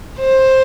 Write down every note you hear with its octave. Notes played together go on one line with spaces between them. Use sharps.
C5